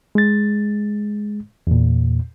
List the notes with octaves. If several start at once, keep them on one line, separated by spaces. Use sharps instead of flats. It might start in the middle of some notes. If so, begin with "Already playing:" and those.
G#3 A6
E2 A#2